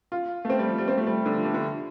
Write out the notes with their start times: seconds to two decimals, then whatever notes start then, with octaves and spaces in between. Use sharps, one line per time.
0.12 F4
0.45 A3
0.50 C4
0.59 G3
0.69 F3
0.78 G3
0.88 C4
0.98 A3
1.07 G3
1.26 D3
1.35 F3
1.45 G3
1.54 D3